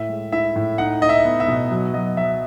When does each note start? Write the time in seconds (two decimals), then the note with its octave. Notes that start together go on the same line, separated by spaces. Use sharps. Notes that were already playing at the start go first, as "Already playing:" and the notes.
Already playing: A2 E5
0.09 G#3
0.32 E4 E5
0.56 A2
0.78 D#4 F#5
1.02 D#4 D#5
1.09 E5
1.25 B3
1.40 E5
1.48 B2
1.71 F#3
1.94 F#3 D#5
2.17 F#3 E5